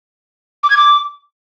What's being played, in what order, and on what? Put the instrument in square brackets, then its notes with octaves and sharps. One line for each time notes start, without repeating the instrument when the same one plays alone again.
[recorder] D6
G#6
D6